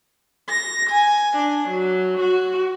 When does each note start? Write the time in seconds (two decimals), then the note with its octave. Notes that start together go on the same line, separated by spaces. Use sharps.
0.49 A#6
0.89 G#5
1.36 D4
1.70 F#3
2.21 F#4